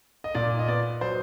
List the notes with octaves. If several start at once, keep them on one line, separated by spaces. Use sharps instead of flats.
D#5
A#2 D5
D#5
B3 D5
F#3 C5